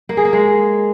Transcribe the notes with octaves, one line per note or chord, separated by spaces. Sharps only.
A#3
G#4
A#3
G#3